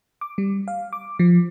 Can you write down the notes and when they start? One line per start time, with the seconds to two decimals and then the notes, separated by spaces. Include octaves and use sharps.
0.21 D6
0.38 G3
0.68 F5
0.93 D6
1.19 F3